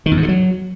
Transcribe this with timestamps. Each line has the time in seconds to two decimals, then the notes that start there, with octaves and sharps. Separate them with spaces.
0.06 D#3
0.12 E2
0.17 G#2
0.23 D3
0.28 F#3